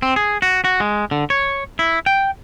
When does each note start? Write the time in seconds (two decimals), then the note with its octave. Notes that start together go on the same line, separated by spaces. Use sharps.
0.02 C4
0.16 G#4
0.42 F#4
0.64 F#4
0.80 G#3
1.11 D3
1.30 C#5
1.79 E4
2.06 G5